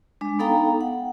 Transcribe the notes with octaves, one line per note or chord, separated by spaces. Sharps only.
G#3 D4
B3 D#4 A4 F5 G5 A#5
F#5